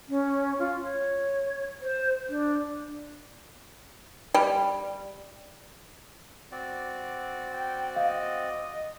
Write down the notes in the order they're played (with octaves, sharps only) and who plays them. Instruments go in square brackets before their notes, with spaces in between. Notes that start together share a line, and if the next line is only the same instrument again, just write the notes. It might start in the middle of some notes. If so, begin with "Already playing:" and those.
[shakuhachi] C#4
F4
C#5
C5
D4
[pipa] G3
[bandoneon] C4 F#4 D5
[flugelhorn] G5
[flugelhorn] D#5 [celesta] F5